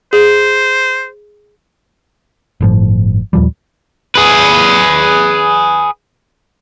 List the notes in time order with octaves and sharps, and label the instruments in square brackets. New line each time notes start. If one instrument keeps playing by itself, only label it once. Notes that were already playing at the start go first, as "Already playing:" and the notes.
[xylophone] G#4 [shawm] C5
[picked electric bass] G1 A2 F3
D#2 A#2 F3 G3
[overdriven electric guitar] G#4 B4